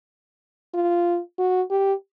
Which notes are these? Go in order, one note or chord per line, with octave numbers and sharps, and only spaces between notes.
F4
F#4
G4